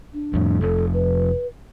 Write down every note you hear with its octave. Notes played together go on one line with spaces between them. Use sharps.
D4
F2 A2
F1 A4
B4